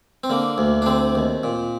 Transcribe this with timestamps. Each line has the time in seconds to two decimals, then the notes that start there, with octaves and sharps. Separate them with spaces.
0.24 C4
0.30 D3 A#3
0.58 D2
0.82 D4
0.86 D3 C4
1.15 D#2
1.43 A#2